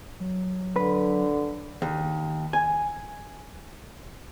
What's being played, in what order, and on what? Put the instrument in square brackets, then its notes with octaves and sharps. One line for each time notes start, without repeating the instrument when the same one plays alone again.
[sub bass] F#3
[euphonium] D3 [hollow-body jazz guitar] B4
[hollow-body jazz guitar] D#2
G#5